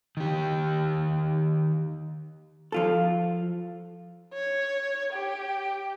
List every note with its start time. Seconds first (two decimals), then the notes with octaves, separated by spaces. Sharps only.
0.17 D#3 G4
2.72 F3 F4 A4
4.34 C#5
5.13 G4